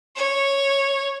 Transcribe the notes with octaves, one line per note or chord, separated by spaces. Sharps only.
C#5